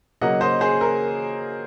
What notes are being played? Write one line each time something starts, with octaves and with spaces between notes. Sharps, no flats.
C#3 F#3 A#3 C#4 D#5 F#5
C5 D#5
G#4 C5
A#4